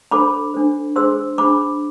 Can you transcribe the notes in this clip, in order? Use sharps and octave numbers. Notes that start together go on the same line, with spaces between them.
D4 A4 C5 B5 D6
D4 A4 C5
D4 G#4 C5 C6 E6
D4 G#4 C5 B5 D6